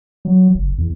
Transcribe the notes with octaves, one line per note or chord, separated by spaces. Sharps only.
F#3
F#1
E2